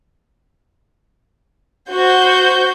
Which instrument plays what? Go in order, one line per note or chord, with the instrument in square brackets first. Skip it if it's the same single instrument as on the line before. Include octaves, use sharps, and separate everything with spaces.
[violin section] F#4 C5 G6